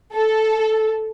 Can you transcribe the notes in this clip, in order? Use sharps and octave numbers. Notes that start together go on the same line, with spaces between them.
A4